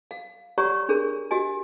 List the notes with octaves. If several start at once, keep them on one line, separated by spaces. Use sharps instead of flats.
F5
G4 C#5 D5 F#5 A#5 C#6
D4 G#4 A#4
F#4 G4 D#5 G#5